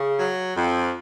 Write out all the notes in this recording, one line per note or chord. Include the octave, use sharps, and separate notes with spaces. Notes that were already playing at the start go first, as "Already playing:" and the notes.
Already playing: C#3
F#3
F2